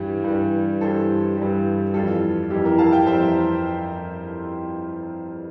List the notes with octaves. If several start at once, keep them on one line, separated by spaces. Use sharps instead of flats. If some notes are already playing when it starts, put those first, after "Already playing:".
Already playing: G2 E3 G3
G2 E3 G3
G2 E3 G3 A4 C5
G2 E3 G3
F2 E3 G3 F4 A4
F2 E3 G3 E4 G4
G4 A#4
F5 A5
E5 G5
F2 E3 G3 C5 E5